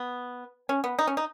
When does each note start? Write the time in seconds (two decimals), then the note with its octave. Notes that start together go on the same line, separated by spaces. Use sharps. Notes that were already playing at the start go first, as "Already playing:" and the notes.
Already playing: B3
0.69 C#4
0.84 B3
0.99 D#4
1.07 C#4
1.17 D#4